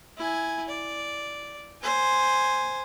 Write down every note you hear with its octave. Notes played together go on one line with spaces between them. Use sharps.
E4 G#5
D5
C5 G#5